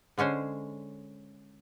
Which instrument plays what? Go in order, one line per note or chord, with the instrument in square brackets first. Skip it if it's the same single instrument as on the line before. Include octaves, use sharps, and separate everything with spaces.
[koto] D3 G#3 C#4 C5 G#5